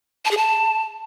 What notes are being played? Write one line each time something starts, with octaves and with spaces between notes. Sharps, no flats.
A5
G#4
A5